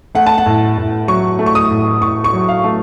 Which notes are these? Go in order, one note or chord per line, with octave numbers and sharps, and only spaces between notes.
A3 F#5
A5
F#5
A2
A2
F#3 C#6
A3
C#6
D#6
A2
A2 C#6
C#6
F#3
F5
A3